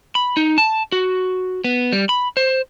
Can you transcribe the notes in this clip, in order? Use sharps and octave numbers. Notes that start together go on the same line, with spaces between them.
B5
D#4
A5
F#4
B3
G3
B5
C5